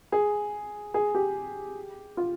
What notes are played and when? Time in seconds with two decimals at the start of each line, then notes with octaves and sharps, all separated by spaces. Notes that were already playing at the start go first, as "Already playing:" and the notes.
0.12 G#4
0.94 G#4
1.15 G4
2.17 F4